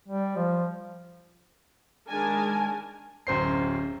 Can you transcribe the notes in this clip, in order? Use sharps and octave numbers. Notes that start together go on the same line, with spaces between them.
G3
F3
D#3 G#3 D4 A#4 G#5 A5
D1 F#2 C5 C7